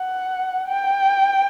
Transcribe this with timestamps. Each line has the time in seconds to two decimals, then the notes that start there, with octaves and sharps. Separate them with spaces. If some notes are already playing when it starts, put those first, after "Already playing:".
Already playing: F#5
0.68 G5